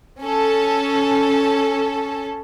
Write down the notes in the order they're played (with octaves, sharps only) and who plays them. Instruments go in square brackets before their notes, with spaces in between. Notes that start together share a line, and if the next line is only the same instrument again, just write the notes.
[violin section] C#4 A4